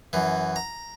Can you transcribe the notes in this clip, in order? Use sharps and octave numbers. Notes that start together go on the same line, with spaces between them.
F#2 E3
A#5